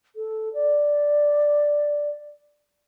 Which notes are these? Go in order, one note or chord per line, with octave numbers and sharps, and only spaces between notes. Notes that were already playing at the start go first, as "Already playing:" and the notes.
A4
D5